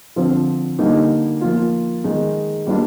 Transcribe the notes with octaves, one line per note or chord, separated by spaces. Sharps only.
D3 F3 C4 F4
D3 G3 A#3 D#4
F3 A#3 F4
D#3 G#3 D#4
G3 A#3 D4 F4